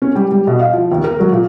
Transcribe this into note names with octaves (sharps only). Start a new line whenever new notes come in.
C#4
G3
G3
B2
F5
F3
D#2
A#4
F#3
A#2